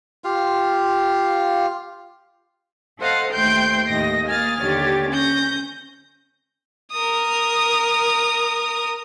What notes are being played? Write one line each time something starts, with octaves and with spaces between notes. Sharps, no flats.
F4 G4 F5
A4 C5 D#5 F5 F#5
D#2 A3 C5 G5 C6 G6
D#2 A2 D#5 A#6
A#3 G#5 D#6 F6 A6
D#2 D3 G4 C#5 A6
C#4 G6 A#6
A#4 D#6